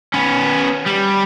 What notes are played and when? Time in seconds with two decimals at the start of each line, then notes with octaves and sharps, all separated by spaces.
0.14 B3 C#4
0.86 G3